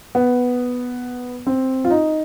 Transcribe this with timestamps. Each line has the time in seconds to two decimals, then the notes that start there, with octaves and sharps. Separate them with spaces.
0.15 B3
1.47 C4
1.85 F4
1.90 D#4